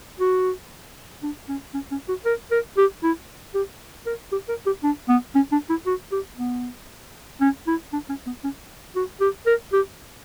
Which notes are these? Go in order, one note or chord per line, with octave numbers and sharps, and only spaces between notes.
F#4
D4
C#4
C#4
C#4
F#4
A#4
A#4
G4
E4
G4
A#4
G4
A#4
G4
D4
B3
C#4
D4
E4
F#4
G4
B3
C#4
E4
D4
C#4
B3
C#4
F#4
G4
A#4
G4